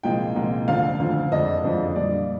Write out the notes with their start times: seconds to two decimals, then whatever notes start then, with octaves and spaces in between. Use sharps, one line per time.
0.03 C2 A#2 F3 G#3 G5
0.36 C2 A#2 F3 G#3
0.68 D2 D3 F3 F5
1.00 D2 D3 F3
1.31 F2 D3 F3 G#3 D4 D#5
1.64 F2 D3 F3 G#3 D4
1.96 A#2 G3 D4 D5